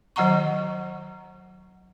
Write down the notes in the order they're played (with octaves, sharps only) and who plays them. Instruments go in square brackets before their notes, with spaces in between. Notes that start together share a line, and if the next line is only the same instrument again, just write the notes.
[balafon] D#3 F#3 D#5 F#5 A#5 C#6